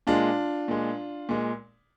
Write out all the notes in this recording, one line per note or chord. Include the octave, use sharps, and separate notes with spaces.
A#2 G#3 D4 F4
A#2 G#3
A#2 G#3